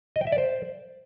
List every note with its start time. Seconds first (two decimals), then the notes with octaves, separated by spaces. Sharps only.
0.16 D#5
0.21 G5
0.27 E5
0.32 D5
0.38 C5